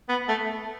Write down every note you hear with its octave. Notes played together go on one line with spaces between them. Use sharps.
B3
A3